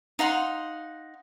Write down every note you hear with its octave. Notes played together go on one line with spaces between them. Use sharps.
D#4 F5 F#5 C6